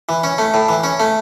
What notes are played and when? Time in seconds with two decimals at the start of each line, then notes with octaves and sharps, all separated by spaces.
0.09 E3
0.24 C#4
0.38 A3
0.54 A2
0.69 E3
0.84 C#4
1.00 A3